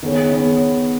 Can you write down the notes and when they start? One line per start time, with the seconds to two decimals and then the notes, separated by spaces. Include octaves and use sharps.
0.03 D#3 B3 G#4 C#5
0.31 D#3 B3 G#4 C#5